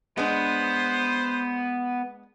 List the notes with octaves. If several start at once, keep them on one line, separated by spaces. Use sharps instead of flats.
G#3 B3 D4 C5